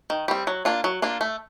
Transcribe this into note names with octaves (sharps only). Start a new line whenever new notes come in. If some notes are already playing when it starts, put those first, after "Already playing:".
D#3
G3 C4
F#3
A#3 D4 F4
F#3
A#3 D4 F4
A3